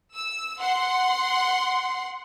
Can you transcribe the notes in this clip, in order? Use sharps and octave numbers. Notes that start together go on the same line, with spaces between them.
E6
F#5 C6